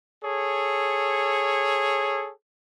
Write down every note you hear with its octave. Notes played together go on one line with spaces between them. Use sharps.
G#4 A4 C#5